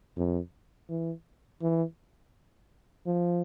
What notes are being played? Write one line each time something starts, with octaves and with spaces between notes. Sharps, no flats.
F2
E3
E3
F3